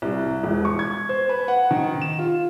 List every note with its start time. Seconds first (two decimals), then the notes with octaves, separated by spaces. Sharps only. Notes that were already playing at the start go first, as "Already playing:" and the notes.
0.02 C2
0.44 E1
0.65 C#6
0.79 G#6
1.09 C5
1.29 B4
1.48 F#5
1.71 D#3
2.02 E7
2.19 F4